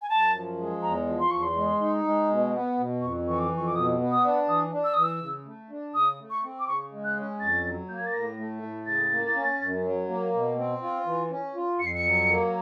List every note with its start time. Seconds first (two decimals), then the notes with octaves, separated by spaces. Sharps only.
0.02 G#5
0.09 F#2 A5
0.34 F3
0.58 G#3
0.82 E2 A#5
1.07 F3
1.19 C6
1.31 E2 C#6
1.43 C6
1.56 G#3
1.80 D#4
2.04 G#3
2.29 B2
2.54 B3
2.78 B2
3.02 F2 C#6
3.26 E3 C#6
3.39 D6
3.51 F2
3.57 C#6
3.66 D6
3.75 B2 D#6
4.00 B3
4.11 D#6
4.24 D4
4.48 E3 D#6
4.73 D4
4.84 E6
4.94 E3 D#6
5.03 E6
5.22 C#3
5.45 A3
5.70 D4
5.94 C#3 D#6
6.19 A3
6.30 C#6
6.43 C4
6.59 D6
6.67 C#3 C#6
6.92 G#3
7.04 F#6
7.17 C#4
7.40 F2 A6
7.65 F#3
7.89 A#3 G6
7.97 G#6
8.06 A6
8.14 A2 A#6
8.38 A3
8.63 A2
8.86 C#3 A6
9.11 A#3
9.35 C#4
9.60 F#2
9.84 F#3
10.09 A#3
10.33 B2
10.57 C4
10.82 F4
11.06 E3
11.30 C#4
11.55 F4
11.79 F2 C#7
11.87 C7
11.94 C#7
12.04 F#3
12.28 A#3